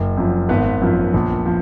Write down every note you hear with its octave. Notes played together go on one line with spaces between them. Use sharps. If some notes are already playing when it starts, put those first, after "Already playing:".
Already playing: F#1
F#2 F3
G#1 B3 B4
F#2 F3
A#1
F3